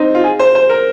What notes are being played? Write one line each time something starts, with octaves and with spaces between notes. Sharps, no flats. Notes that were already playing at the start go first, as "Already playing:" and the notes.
Already playing: C4 D#4
F4
G#4
C5
C5
A#4